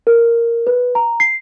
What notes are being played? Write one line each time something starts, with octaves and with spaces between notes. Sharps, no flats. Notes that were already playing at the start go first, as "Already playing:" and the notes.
A#4
B4
A#5
C7